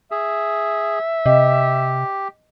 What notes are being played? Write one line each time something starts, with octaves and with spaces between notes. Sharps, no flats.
G#4 E5
C3 G4 D#5